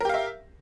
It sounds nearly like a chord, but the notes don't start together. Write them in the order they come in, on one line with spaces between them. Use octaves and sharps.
A#4 G4 F5 E5